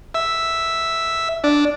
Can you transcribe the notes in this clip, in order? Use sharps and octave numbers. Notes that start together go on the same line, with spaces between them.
E5
D4